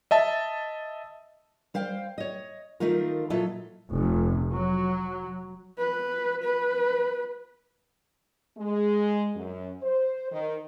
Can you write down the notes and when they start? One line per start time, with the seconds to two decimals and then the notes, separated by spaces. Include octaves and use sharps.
0.11 D#5 E5 A5
1.74 G3 C5 F5 G5
2.18 C#5 D#5
2.80 D#3 A3 D#4 F4 A#4
3.30 A#2 F#3 E4 F4 A4 D#5
3.91 F1
4.51 F#3
5.78 B4
6.44 B4
8.57 G#3
9.36 F#2
9.82 C5
10.32 D#3